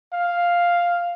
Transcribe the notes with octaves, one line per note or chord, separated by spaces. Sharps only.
F5